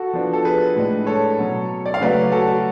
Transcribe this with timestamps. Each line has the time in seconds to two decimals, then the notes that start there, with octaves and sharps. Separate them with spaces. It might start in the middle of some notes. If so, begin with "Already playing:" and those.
Already playing: F#4 A4
0.13 F3 B3 D4
0.33 A4
0.45 G#4 B4
0.76 A2 G#3 D4
1.06 A4 C#5
1.38 B2 F#3 C#4
1.86 D5
1.94 F5
2.00 C#3 F#3 A3 C#4 B4 D5
2.32 F#4 A4
2.47 F#4